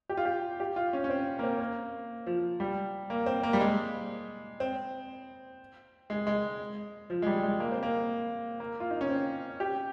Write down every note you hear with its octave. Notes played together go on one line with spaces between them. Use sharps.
G4
F4
G4
G4
F4
C#4
C#4
C4
A#3
C4
A#3
F3
G3
A#3
C4
A#3
G3
G#3
C4
G#3
G#3
F3
G#3
G3
G#3
A#3
C4
A#3
A#3
F4
D#4
C#4
C4
G4